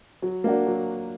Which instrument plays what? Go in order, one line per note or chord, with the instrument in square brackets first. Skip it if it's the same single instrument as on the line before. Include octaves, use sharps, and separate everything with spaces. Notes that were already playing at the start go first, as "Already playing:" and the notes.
[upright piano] F#3
A#3 D4 F#4
F#3